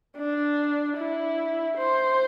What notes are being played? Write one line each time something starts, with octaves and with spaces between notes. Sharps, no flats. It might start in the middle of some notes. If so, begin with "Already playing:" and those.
D4
E4
C5